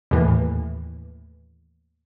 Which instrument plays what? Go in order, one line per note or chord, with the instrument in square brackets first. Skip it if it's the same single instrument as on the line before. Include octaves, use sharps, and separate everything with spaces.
[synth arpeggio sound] D#2 A2 E3